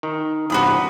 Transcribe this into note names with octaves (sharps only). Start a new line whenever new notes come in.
D#3
E2 G2 C3 F#4 B5 D#6